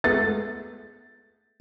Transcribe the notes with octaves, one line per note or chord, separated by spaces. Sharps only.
G#3 A3 B3 A6